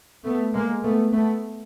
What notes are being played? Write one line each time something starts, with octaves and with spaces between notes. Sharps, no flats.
A3 B3
G#3 A#3
A3 B3
A3 B3